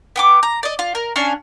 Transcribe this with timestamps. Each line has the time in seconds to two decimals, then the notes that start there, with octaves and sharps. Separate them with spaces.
0.16 B3 G5 D6
0.43 A#5
0.63 D5 D#5
0.79 F4
0.95 A#4
1.16 C#4 D4 F5 G#5